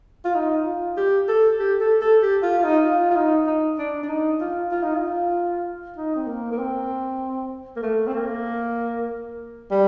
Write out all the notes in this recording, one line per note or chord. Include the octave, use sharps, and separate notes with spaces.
F4
D#4
F4
G4
A4
G4
A4
A4
G4
F4
F4
D#4
F4
F4
D#4
D#4
D4
D4
D#4
F4
F4
D#4
F4
D#4
C4
A#3
A#3
C4
A#3
A3
C4
A#3
G3